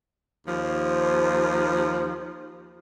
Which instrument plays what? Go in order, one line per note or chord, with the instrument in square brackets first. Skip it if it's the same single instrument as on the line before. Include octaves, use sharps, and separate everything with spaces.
[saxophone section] D#2 F3